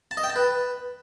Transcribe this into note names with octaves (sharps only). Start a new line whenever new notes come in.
A5
D#5
G5
A5
B4